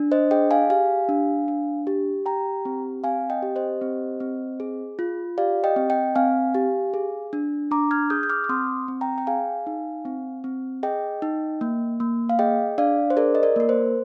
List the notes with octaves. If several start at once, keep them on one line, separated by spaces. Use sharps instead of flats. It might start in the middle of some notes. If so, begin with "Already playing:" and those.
Already playing: D4
C5 D#5
G#4 D#5 G5
F5 G#5
G4 F5 G#5
D4
D4
G4
G4 G5 A#5
C4
C4 F5 G#5
D#5 G5
G4
C5 D#5
C4
C4
G#4
F4
G4 D5 F5
D#5 G5
C4
D#5 G5
C4 F5 G#5
G4
G#4
D4
D4 A#5 D6
F6 G#6
G#4 D#6 G6
G6
D6 F6
D6
C4 C6 D#6
C4
G5 A#5
G5
G#4 F5 G#5
D#4
C4
C4
G#4 D#5 G5
D#4
A#3
A#3
F5
G#4 D#5 G5
D4 D5 F5
C5
G#4 A#4 D5
D#5
A#4 D5
A#3 A#4
C5